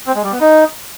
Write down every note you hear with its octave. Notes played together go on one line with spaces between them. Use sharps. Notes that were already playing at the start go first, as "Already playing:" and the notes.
C4
G#3
G3
B3
D#4